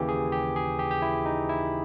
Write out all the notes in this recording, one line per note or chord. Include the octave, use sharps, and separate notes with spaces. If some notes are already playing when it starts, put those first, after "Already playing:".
Already playing: D#2 C#3 E3 G4
G#4
G4
G#4
G4
G4
E4
D#4
E4